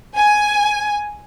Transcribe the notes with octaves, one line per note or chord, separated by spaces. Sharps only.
G#5